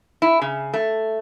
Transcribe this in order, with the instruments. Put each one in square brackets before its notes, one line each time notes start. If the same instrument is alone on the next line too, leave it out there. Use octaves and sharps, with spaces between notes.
[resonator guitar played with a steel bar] E4
C#3
A3